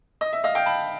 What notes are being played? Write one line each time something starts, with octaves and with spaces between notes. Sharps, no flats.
D#5
E5
D#5 F5
F5 G5
A5 B5